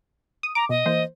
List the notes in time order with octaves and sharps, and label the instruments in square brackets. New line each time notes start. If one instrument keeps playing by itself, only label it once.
[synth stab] D#6
[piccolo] A#5 [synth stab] D6
[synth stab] B2 [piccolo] D#5
[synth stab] E3 A#3 C5